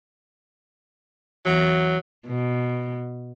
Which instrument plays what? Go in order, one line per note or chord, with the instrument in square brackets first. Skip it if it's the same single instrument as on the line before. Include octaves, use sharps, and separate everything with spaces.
[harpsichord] E2 A#5 [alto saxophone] F#3
[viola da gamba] B2